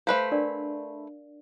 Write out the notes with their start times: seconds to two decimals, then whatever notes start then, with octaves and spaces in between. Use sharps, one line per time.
0.07 A3 B4 C5 F5
0.32 D4 A#4 D5